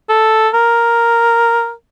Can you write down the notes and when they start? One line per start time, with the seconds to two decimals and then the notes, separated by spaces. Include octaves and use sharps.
0.09 A4
0.54 A#4